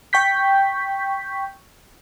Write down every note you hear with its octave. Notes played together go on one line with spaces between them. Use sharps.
G5 C#6 G6 B6